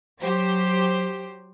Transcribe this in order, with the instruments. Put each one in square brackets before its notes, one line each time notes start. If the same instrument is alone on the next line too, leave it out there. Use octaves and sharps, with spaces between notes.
[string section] F#3 G4 C5